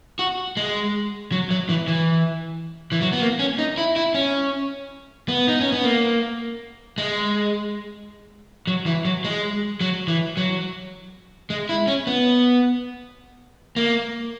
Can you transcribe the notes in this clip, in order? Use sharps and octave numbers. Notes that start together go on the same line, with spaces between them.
F#4
G#3
F#3
F#3
E3
E3
E3
F#3
B3
A#3
C#4
D#4
E4
E4
C#4
B3
D#4
C#4
B3
A#3
G#3
F#3
E3
F#3
G#3
F#3
E3
F#3
G#3
E4
C#4
B3
A#3